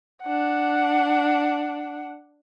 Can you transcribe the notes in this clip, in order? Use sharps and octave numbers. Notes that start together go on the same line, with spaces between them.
D4 F#5